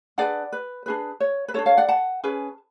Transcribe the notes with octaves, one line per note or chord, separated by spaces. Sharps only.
D4 G#4 B4 D5 F#5
B4
D4 G#4 B4
C#5
B4
D4 F4 A4 C#5
C#5 F5
D5 F#5
F#5 A5
C#4 G#4 B4